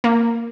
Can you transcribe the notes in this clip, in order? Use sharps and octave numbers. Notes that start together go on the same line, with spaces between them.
A#3